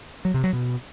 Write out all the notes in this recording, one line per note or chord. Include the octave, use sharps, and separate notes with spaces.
F#3
C3
F#3
B2